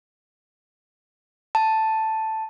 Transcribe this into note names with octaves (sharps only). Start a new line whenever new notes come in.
A5